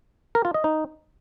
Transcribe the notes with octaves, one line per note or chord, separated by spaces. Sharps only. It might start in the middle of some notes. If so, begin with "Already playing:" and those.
A#4
F4
D#5
D#4